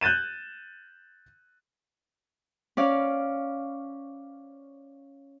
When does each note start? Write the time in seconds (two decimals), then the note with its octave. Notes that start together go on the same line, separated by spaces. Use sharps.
0.01 F#6 G6 A6 D#7 E7
2.77 C#4 D5 F5